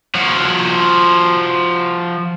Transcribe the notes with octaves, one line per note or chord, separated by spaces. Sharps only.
F3 F#4